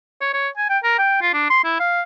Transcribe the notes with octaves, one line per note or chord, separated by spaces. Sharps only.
C#5
C#5
G#5
G5
A#4
G5
F4
D4
C6
E4
F5